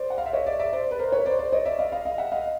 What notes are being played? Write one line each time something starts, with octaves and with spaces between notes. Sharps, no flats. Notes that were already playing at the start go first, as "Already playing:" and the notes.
Already playing: C5 D5
F#5
F5
E5
C#5 D#5
D5 E5
D5 E5
C5 D5
B4
A#4 C5
B4 C#5
C5 D5
C5 D5
C#5 D#5
D5 E5
D#5 F5
D#5 F5
D#5 F5
E5 F#5
D#5 F5